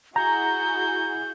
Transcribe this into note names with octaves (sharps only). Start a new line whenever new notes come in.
E4 F#4 G#4 A#5 G6